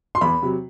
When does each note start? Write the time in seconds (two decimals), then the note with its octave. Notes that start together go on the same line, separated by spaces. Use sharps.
0.15 C6
0.21 E2 B5
0.42 C3 F#3